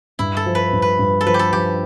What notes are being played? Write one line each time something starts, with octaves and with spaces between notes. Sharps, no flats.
G2 E4
A4
F3
B4
G2
B4
G2
A4
F3 B4
G4
A4
F3 G4